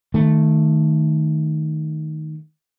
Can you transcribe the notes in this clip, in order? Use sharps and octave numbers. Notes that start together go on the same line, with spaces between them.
D#3 A3